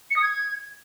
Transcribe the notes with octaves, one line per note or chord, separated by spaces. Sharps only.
C#7
D#6
G#6